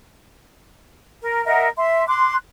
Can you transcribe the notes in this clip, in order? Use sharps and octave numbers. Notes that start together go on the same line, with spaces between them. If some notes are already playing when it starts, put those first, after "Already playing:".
A#4
A#4 D#5 E5 F#5
E5 C6
C6 D6 F#6